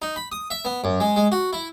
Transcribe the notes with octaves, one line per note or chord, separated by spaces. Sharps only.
D#4
B5
D#6
E5
B3
F#2
G#3
G#3
F#4
E4